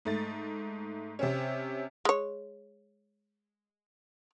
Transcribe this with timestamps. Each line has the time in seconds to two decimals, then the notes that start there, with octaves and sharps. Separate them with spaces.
0.05 G#2 A3 A6
1.19 C3 C4 C#4
2.05 G#3 C#5